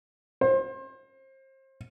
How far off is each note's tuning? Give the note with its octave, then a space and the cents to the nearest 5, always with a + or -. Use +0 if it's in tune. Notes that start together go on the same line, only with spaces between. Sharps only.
C5 +30